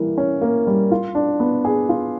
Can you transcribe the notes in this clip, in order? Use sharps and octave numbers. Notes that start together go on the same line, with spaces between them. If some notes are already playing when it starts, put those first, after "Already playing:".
Already playing: E3 G3 A#3
C#4
A#3
G3
F4
D4
B3
G#4
F4